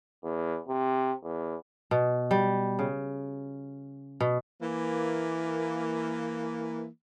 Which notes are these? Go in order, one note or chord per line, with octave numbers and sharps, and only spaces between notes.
E2
C3
E2
B2
G3
C#3
B2
E3 A#3